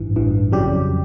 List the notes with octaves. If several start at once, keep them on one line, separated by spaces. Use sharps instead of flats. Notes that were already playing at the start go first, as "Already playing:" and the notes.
Already playing: A1 G2 E3
A1 G2 E3
F2 C#3 F#3 G3 G4